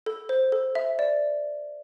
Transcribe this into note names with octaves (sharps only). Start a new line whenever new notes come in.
A4
C5
A4
E5
D5